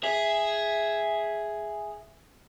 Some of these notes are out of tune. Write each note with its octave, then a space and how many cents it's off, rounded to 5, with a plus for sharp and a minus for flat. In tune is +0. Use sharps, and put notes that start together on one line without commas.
G#4 +0 E5 +0